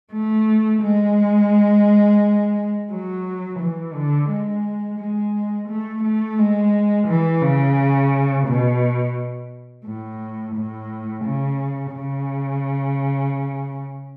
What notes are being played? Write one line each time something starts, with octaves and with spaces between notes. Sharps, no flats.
A3
G#3
F#3
E3
D3
G#3
G#3
A3
A3
G#3
E3
C#3
B2
A2
A2
C#3
C#3